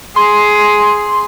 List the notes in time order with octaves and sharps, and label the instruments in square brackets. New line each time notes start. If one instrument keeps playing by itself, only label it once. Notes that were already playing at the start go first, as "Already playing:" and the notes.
[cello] G#4 [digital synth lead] C6